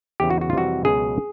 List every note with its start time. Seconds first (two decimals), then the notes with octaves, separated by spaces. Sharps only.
0.20 E2 C#3 E3 G4
0.30 F#4
0.41 F#4
0.50 F4
0.53 F2 C3 E3 G3 F#4
0.85 C#2 B2 F#3 G#4